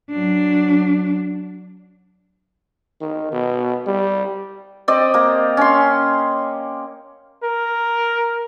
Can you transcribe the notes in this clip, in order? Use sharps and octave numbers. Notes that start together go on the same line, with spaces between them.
F#3 D4
D#3
B2
G3
C4 G4 D5 D#5
A#3 A#5
C#4 C6
A#4